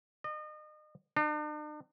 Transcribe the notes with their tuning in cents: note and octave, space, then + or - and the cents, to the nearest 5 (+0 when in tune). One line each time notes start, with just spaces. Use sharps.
D#5 -35
D4 +45